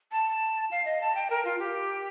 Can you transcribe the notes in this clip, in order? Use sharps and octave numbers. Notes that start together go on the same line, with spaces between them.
A5
F5
D#5
A5
G5
A#4
F4
G4